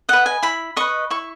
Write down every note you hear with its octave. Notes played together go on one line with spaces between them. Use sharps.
B4 D#5 F#5
G#5
E4 B5
B4 D#5 C#6
E4 C#6